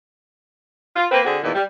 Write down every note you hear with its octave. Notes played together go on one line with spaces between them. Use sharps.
F4
A#3 C4 B4
D3 C4 F#4 G#4
E2 A#2 D#3 E3
G3